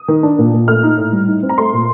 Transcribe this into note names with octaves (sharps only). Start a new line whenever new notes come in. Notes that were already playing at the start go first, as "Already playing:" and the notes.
Already playing: D#6
D#3
D4
A#2
A#2
A3 F6
D#4
A2
G3
D#4
C4
A#5
A3 C6
A#2